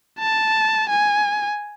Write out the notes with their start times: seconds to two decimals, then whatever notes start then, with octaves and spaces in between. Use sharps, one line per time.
0.19 A5
0.90 G#5